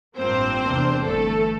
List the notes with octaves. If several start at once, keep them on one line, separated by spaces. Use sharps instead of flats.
A1 G2 F3 A#3 C4 C5
E2 C3 E3 A#3 D4
G1 G2 E3 A3 A4